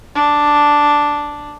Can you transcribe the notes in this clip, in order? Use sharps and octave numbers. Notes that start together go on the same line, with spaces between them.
D4